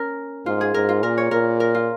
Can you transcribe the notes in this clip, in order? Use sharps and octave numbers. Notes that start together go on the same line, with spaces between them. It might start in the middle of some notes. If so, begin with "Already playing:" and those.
Already playing: C#4 A#4
G#2 F4
G#4
G#2 A#4
F4
A#2 A#4
C#5
A#2 A#4
A#4
F4